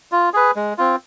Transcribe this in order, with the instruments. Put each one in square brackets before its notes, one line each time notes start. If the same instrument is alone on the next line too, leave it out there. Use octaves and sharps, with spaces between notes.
[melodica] F4
G#4 B4
G#3
C4 F4